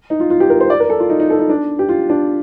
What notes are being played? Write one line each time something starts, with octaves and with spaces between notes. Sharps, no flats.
D#4
F4
F4
G4
A#4
C5
D5
A#4
A4
F4
D#4
D#4
A4
D#4
D4
G4
F4
D4